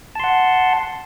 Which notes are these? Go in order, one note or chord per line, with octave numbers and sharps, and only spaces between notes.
F#5 A5 C6